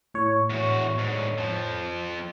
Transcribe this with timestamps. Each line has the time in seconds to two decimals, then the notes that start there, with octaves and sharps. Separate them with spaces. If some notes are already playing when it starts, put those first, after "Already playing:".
0.14 A2 C#5
0.50 E2 F#4
0.99 G#2 D3
1.38 F2 F3